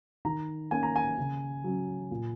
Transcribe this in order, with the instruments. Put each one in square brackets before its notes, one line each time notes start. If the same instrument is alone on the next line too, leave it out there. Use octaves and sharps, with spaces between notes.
[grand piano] D#3 A#5
A#3 C#4 G#5
A#5
G#5
C#3
F#3 C#4
A#2